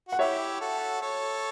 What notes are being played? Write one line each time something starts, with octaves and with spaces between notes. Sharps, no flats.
F#4 F#5
E4 G4 C#5 E5
F#4 A4
A4 C#5